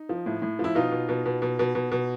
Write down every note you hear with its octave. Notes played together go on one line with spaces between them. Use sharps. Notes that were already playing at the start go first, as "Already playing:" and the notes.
Already playing: D#4
F3
A2
A2
F3
E4
B2 D#4 F4
B2
B2
B2
B2
B2
B2
B2